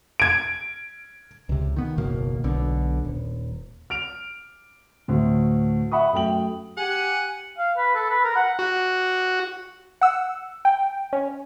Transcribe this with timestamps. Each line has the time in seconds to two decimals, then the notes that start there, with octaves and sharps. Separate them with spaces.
0.20 G#6 D7
1.49 C#2 C3
1.76 D#3 B3
1.97 F#1 D#2 B2 A#3
2.44 B1 B2 D3
3.05 D#1
3.90 F6 D7 F7
5.08 D2 A2
5.91 E5 F#5 B5 C#6 D#6
6.13 F#2 A3 G5 F#7
6.77 G4 F#5 G#5
7.58 F5
7.77 B4
7.95 A4
8.10 B4
8.24 A#4
8.36 F#5
8.59 F#4
10.01 F#5 E6
10.65 G5
11.13 C#4